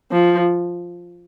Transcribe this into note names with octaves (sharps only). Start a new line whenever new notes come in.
F3